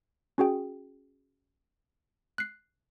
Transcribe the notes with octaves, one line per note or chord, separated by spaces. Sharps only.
C#4 F#4 G#4 G5
F#6 C7